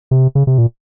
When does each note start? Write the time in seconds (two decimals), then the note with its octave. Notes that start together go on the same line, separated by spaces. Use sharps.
0.11 C3
0.35 C#3
0.47 C3
0.58 A#2